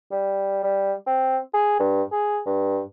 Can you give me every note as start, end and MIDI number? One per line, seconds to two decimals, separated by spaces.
0.12 0.59 55
0.63 0.93 55
1.07 1.38 60
1.54 1.78 68
1.80 2.03 43
2.12 2.39 68
2.46 2.82 43